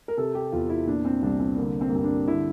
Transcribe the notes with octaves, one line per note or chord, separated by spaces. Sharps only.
A#4
C3 A4
G4
E2 F4
E4
A#2 D4
C4
C2 D4
C4
D3 A#3
C4
A#3
G2 C4
D4
D3 E4